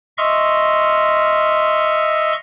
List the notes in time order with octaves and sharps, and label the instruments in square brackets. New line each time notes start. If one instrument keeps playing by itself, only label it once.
[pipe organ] D#5 E5 C6 C#6 F6